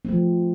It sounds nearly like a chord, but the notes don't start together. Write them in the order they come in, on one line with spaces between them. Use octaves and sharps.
C4 A3 F3